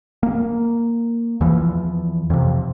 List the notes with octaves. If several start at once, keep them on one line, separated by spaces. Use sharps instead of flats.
A#3
E2 E3 F3
F2 C3